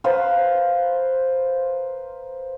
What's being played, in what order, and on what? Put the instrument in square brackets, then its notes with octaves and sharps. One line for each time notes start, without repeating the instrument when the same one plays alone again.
[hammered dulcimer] B4 C5 F5 A#5